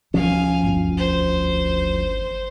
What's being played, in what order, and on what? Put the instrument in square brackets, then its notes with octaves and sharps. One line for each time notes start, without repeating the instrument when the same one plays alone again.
[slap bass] D2 F3 C#4 [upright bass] G3 [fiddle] F5 G#5
[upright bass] G1 E2
[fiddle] C5